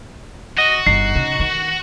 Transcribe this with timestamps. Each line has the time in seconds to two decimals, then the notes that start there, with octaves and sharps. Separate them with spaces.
0.58 F#4 D#5
0.86 G1 D#4 C7
1.15 C#3
1.40 D#3